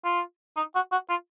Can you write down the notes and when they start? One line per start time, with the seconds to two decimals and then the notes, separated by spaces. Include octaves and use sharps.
0.05 F4
0.57 D#4
0.75 F#4
0.92 F#4
1.10 F4